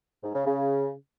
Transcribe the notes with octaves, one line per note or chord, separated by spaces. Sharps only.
G#2
C#3
C#3